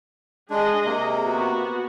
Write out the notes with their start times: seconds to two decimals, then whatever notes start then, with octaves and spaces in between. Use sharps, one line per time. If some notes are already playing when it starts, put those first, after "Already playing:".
0.50 G#3 D4 G#4 D#5
0.85 C3 A#3
1.25 B3 F#4